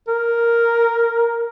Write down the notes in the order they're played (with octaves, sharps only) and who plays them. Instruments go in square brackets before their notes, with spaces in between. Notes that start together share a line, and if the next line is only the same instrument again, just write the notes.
[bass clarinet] A#4